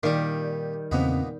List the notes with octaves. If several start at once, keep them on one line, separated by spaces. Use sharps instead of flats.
A#2 D#3 G3 G4
E2 A#2 C#3 B3 C4 D#4